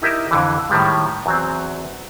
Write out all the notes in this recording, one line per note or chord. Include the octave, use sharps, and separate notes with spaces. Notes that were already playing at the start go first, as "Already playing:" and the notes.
D#4 E4 G4 A#4 D#5 E5
F2 D3 E3
A2 D#3 G3 G#3
E2 F#3 C4